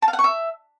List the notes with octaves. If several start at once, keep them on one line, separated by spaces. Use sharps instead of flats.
A5
F5
F#5
C#6
E5